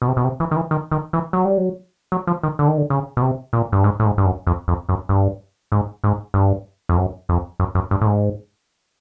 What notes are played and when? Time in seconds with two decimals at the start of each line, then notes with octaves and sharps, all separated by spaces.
0.02 B2
0.08 C3
0.17 B2
0.24 C3
0.40 E3
0.51 D#3
0.56 E3
0.71 D#3
0.91 D#3
1.13 E3
1.33 F#3
1.45 G3
1.58 F#3
2.12 F#3
2.27 F3
2.43 D#3
2.59 D3
2.68 D#3
2.78 D3
2.90 C#3
3.17 B2
3.22 C3
3.53 A#2
3.72 G2
3.84 G#2
4.00 A2
4.05 G#2
4.18 G2
4.26 F#2
4.47 F2
4.68 F2
4.89 F#2
5.09 G2
5.72 G#2
6.04 G#2
6.34 G2
6.89 F2
6.97 F#2
7.29 F2
7.60 F#2
7.75 F#2
7.91 G2
8.01 A2
8.06 G#2